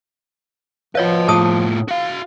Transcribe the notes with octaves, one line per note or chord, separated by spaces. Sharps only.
F3 F4 B4 C#5 D#5 F5
A2 F4 G#4 A5 D#6
F#4 F5